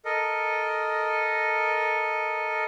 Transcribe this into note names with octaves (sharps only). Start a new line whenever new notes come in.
A4 A#4 D#5